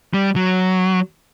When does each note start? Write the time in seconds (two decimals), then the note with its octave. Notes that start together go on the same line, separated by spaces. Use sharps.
0.14 G3
0.36 F#3